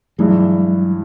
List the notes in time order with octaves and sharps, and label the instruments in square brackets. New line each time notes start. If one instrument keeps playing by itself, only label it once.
[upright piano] G2 E3 G#3 [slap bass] F#3